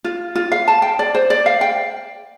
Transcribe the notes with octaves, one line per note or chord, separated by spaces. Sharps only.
F4
F4
F5
A5
G5
D5
C5
D5
F5
G5